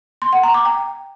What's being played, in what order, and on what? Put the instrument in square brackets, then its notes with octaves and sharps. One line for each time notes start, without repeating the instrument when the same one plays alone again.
[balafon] C6
F#5
A#5
D6
G5